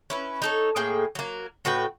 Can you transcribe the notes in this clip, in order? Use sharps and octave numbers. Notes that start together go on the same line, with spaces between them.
C#4 E4 B4
D#4 A4 C#5
A2 A#3 G#4 G5
F#3 A#3
A2 F#4 B4 G5